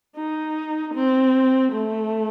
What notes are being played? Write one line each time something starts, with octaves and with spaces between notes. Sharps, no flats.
D#4
C4
A3